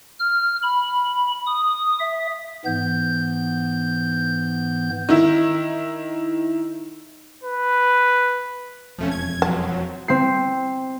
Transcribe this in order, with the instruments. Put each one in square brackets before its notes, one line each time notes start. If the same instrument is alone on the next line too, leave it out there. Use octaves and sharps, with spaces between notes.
[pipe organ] F6
B5
D#6
E5
G#2 E3 B3 G6
[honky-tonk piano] D#3 E4
[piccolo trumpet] B4
[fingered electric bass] E1 F2 [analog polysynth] F3 A3 C#4
[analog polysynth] G#6
[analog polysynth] F3 F#3 [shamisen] A5
[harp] C4 C7